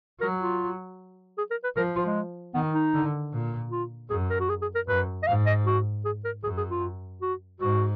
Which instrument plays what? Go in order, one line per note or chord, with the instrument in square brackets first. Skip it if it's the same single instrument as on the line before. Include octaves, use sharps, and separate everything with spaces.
[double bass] F#3 [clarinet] A#4
[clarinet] F4
G#4
A#4
B4
[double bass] F3 [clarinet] A#4
[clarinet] F4
G#3
[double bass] D#3 [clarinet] B3
[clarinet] D#4
[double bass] D3
A#2
[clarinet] F4
[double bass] F#2 [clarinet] G#4
[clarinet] A#4
F#4
G#4
G#4
A#4
[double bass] F#2 [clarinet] B4
[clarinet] D#5
[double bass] G#2 [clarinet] F5
[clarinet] D#5
F#4
G#4
A#4
[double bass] F#2 [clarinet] G#4
[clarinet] G#4
F4
F#4
[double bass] G#2 [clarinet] F#4